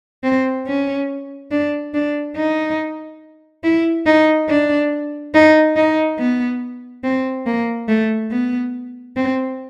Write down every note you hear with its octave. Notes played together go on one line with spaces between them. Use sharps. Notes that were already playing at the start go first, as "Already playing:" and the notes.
C4
C#4
D4
D4
D#4
E4
D#4
D4
D#4
D#4
B3
C4
A#3
A3
B3
C4